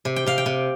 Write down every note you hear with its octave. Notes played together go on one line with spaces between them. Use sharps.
C3
G5
C3 F5
G5
C3